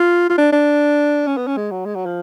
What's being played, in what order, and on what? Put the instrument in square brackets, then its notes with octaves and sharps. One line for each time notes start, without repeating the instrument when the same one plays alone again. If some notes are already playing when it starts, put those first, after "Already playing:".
Already playing: [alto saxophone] F4
F4
D4
D4
C#4
B3
C#4
G#3
F#3
G#3
F#3
F3